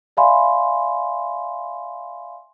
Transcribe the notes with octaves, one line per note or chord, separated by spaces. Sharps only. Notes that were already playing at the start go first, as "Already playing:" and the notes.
D5 E5 F5 G#5 B5 C6